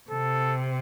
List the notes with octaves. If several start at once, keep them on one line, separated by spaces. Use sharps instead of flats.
C3 A4